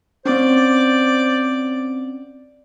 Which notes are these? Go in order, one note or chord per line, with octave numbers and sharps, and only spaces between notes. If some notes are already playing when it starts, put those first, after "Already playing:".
C4 C#4 C5 D5